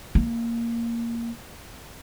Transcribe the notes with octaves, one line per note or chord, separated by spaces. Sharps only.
A#3